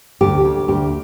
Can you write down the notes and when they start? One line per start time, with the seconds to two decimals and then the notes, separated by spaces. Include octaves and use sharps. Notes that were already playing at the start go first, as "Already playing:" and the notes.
0.21 D2 G4
0.44 D2
0.68 D2 G4